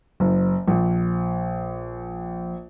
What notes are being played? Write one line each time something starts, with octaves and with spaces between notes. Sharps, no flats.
F#1
A#1